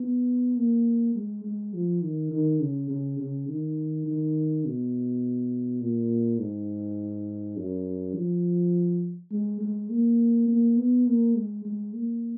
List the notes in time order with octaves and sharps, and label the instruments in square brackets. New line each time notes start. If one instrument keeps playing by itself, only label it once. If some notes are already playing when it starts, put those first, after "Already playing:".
Already playing: [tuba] B3
A#3
G#3
G#3
F3
D#3
D#3
C#3
C#3
C#3
D#3
D#3
B2
A#2
G#2
F#2
F3
G#3
G#3
A#3
A#3
B3
A#3
G#3
G#3
A#3